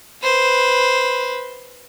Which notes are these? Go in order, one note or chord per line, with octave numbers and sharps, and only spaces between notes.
B4 C5